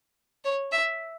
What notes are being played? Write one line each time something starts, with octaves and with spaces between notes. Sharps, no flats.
C#5
E5